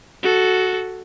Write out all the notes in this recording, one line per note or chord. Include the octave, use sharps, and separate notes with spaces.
F#4 A4